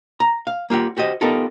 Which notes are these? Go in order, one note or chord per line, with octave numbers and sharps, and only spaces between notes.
A#5
F5
A#3 F4 G4 F#5
F#4 G4 C5 D#5
B3 D#4 F4 G4 A4 A#4